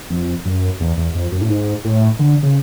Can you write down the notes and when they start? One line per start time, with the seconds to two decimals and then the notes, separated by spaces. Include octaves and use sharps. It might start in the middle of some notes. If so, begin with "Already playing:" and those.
0.10 F2
0.45 F#2
0.80 E2
0.97 E2
1.15 F2
1.32 F#2
1.41 A2
1.49 G#2
1.85 A2
2.19 D3
2.43 C#3